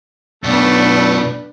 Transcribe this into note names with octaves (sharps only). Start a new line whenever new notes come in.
F#2 B2 A3 D4 B4